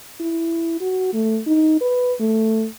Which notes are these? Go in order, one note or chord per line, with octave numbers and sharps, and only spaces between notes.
E4
F#4
A3
D#4
B4
A3